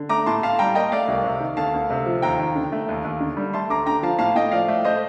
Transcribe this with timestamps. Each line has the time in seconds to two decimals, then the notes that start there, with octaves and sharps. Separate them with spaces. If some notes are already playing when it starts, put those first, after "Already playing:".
Already playing: D3
0.09 A3 A#5 D6
0.26 A2 A5 C6
0.42 A2 F5 A5
0.59 G3 G5 A#5
0.75 A#3 D#5 G5
0.92 A3 D5 F5
1.08 C2
1.24 C3
1.40 D#3
1.57 D2 F5 A5
1.74 D2
1.90 C3
2.06 F3
2.22 D#2 G5 A#5
2.39 D#2
2.55 D3
2.72 A3
2.89 D#2
3.04 D#2
3.21 D3
3.37 G3
3.54 A3 A5 C6
3.70 D2 A#5 D6
3.86 D3 G5 A#5
4.03 F3 F5 A5
4.19 A2 F5 A5
4.35 A2 D#5 G5
4.52 F3 D5 F5
4.68 A3
4.85 A3 C5 D#5